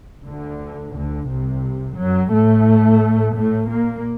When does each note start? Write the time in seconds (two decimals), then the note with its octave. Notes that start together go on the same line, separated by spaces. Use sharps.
0.24 D2 D3
0.93 D2 D3
1.27 C2 C3
1.95 F#2 F#3
2.30 A2 A3
3.33 A2 A3
3.67 A#2 A#3